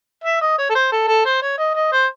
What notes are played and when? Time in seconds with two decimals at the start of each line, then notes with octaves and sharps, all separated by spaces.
0.24 E5
0.41 D#5
0.58 C#5
0.70 A4
0.75 C5
0.92 A4
1.08 A4
1.25 C5
1.42 C#5
1.58 D#5
1.75 D#5
1.92 C5